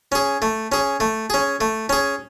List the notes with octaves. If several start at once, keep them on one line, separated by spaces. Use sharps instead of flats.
C#4 G#4
A3
C#4 G#4
A3
C#4 G#4
A3
C#4 G#4